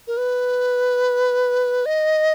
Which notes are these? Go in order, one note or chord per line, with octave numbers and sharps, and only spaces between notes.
A#4
B4
D#5